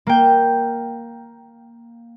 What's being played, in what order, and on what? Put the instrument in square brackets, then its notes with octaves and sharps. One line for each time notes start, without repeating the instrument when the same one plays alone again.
[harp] A#3 G5